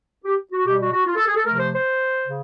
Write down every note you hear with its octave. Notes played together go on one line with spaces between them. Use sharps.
G4
F#4
B2 G3 G4
F#4
F#4
F4
A4
G#4
A4
C3 F3 A3 A#4
C5
C5
C#3